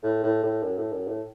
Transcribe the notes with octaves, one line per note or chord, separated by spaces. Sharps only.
A2
A2
A2
F#2
A2
F#2
A2